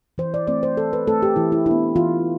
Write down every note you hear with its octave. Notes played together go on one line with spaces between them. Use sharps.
E3 C5
D5
A3 C4 D5
C5
E3 A4
B4
A3 C4 A4
G4
E3 E4
E4
B3 D4 E4
E3 F4